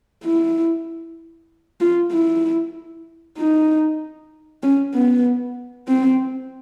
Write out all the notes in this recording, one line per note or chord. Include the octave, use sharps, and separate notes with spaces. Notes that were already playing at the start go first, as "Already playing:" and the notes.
E4
F4
E4
D#4
C#4
B3
C4